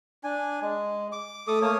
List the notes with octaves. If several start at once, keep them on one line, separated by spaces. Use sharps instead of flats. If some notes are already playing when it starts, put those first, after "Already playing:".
D4 G#5
G#3
D6
A3 A4 D6 D#6
A3 A#3 C#5 D#6